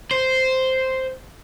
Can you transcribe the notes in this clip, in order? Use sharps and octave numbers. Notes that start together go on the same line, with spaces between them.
C5